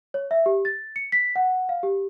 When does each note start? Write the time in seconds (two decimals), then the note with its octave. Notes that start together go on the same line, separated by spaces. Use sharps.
0.14 C#5
0.31 E5
0.46 G4
0.65 A6
0.96 C#7
1.12 B6
1.36 F#5
1.69 F5
1.83 G4